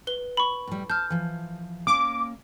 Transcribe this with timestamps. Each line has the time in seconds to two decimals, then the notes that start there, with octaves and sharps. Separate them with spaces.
0.07 B4 G7
0.37 B5 C#6
0.67 A2 G3
0.90 A5 F6 G6
1.10 E3 F3
1.87 A#3 C#4 D6